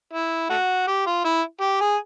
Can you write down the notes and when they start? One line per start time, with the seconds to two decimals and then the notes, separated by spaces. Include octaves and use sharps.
0.13 E4
0.50 A3 F#4
0.88 G4
1.07 F4
1.25 E4
1.61 G4
1.81 G#4